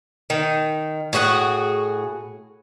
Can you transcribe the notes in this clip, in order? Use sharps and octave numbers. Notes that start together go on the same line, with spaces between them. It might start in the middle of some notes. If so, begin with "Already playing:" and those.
D#3
A2 F#4 G#4 F#5